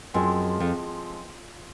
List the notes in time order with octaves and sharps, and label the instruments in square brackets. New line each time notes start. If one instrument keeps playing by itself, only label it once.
[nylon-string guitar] F#2 [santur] F3 G#3 C4
[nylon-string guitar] F2